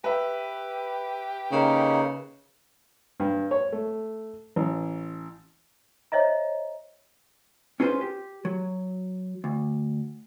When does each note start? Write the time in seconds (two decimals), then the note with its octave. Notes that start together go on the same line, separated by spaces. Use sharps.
0.04 G4 B4 E5
1.52 C#3 A#3 D#4
3.20 G2
3.51 C#5
3.72 A3
4.56 A1
6.12 C5 C#5 D#5 E5 A#5
7.80 C#4 F4 G#4 A4 B4 C5
8.01 G4
8.45 F#3
9.44 D2